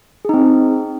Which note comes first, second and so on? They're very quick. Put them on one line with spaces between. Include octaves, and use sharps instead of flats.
G#4 D#4 C4